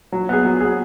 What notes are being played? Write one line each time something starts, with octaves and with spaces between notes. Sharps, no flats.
F#3
B3 G#4
F#3
B3 G#4